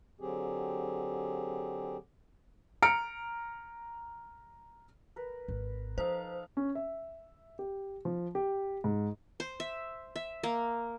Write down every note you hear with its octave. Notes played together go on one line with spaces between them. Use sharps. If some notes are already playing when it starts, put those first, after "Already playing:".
D3 F#3 C4 G4 G#4
A#5 F6 C#7 D7
A#4 B4
G#1
F3 D#4 A4 C5 F5
C#4
E5
G4
F3
G4
G#2
C5
E5
E5
A#3